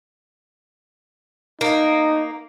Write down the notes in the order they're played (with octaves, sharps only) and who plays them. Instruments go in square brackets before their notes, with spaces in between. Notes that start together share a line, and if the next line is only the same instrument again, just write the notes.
[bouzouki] A#3 [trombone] D#4